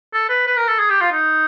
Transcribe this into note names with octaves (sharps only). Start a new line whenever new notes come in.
A4
B4
B4
A#4
A4
G#4
G4
F4
D#4